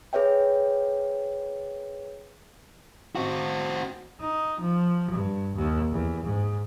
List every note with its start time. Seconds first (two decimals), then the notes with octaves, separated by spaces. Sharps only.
0.13 G#4 B4 C#5 E5 G5
3.15 C4 F#4
4.20 D#4
4.61 F3
5.11 G2
5.56 D#2
5.91 E2
6.24 G#2